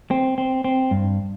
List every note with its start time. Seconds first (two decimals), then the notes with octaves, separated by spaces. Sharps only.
0.11 C4
0.38 C4
0.64 C4
0.91 G2